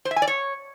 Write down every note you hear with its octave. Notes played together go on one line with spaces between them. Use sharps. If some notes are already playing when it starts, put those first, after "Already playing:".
C5
E5
G#5
D5
C#5